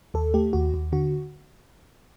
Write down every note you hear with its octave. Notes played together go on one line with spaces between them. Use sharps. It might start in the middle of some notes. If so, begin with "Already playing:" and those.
D#2 A4
A3 G4
D#2 F#4
D#2
D3 F#4